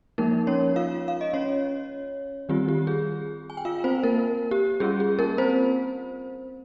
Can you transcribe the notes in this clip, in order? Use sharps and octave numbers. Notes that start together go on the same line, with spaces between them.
F3 G#3 A#3 D#4 A#4
C#4 C#5
F4 F5
F5
D#5
C#4 C#5
D#3 G3 C4 F4 G4
G4
G#4
G#5
G5
F4 F5
C4 C5
A#3 A#4
G4
G3 C#4 F4 G#4
G#4
A#3 A#4
C4 C5